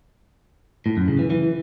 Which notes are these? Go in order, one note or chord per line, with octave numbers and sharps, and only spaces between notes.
A2
F#2
C#3
E3
E3